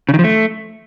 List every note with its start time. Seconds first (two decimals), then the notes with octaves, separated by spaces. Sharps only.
0.09 C#3
0.14 D#3
0.19 F3
0.24 A3